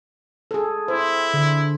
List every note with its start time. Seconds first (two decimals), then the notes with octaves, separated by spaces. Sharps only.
0.51 G#4 A4
0.88 E4 C5
1.34 D3